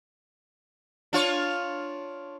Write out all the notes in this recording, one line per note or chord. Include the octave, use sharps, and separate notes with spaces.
D4 F4 C#5